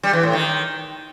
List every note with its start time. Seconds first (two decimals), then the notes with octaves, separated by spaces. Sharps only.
0.03 G3
0.13 E3
0.23 A2
0.33 D#3